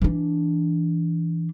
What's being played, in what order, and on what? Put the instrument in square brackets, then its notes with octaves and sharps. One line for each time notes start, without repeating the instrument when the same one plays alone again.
[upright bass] E3 D4